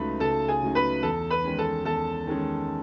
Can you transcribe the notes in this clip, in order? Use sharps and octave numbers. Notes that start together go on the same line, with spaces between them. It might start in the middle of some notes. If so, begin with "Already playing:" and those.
Already playing: C#2 C#3 F#3 A3 D#4 B4 B5
C#2 A4 A5
G#4 G#5
C#3 F#3 A3 D#4
B4 B5
E2 A4 A5
B4 B5
D#3 G#3 C#4
A4 A5
E2 A4 A5
D#3 G#3 C#4